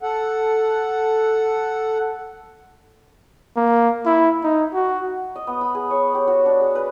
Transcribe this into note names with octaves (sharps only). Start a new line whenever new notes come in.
A4 F#5
A#3
E4
D#4
F#4
D#5
B3
B5
G#4
C#5
G4
F#4
D4
G#4
B4